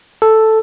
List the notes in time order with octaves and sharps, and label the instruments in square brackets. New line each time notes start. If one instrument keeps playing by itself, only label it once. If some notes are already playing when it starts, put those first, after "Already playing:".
[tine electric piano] A4